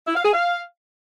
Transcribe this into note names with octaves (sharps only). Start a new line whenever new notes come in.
E4
F5
G#4
F5